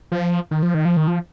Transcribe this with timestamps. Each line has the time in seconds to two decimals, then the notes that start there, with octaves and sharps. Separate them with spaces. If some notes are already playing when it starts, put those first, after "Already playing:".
0.12 F3
0.51 D#3
0.63 F3
0.74 D#3
0.85 F3
0.97 D#3
1.07 F3